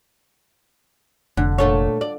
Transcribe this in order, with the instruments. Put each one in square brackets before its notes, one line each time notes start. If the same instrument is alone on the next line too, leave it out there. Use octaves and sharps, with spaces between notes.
[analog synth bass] F1 [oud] D3
[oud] A#2 A3 C#5
D5